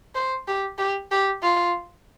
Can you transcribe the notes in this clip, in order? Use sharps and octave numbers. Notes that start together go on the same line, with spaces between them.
C5
G4
G4
G4
F4